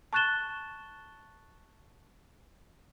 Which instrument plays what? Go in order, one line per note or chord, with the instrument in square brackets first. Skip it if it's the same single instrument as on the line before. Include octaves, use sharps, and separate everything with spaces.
[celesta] A5 C#6 F#6 A6 E7 G7